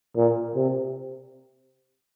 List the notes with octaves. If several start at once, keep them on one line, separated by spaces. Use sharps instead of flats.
A#2
C3